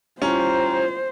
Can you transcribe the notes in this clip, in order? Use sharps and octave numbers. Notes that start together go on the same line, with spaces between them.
G3 C#4 E4 F4 C5 G5 A#5